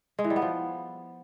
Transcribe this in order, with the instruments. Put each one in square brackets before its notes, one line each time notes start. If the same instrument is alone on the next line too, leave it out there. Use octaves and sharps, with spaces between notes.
[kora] G#3
E3
G3
B3
F3